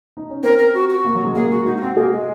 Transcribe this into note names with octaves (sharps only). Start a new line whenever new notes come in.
D#4
C#4
C4 A#4
A#4
F#4
F#4
A#3
F#3
G#3
A#3 G#4
F#4
D#4 F#4
A#3
C4 F#4
A#3 G#4
G#3